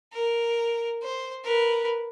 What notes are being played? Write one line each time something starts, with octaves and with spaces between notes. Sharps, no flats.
A#4
C5
A#4 B4